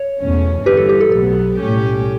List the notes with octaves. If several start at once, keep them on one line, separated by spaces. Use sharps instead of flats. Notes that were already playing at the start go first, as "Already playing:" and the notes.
Already playing: C#5
E2 B2 A3 C#4
G1 G2 E3 G4 B4
A4
G4
A4
B1 A2 F#3 B3 A4
B1 A2 G3 C#4 G4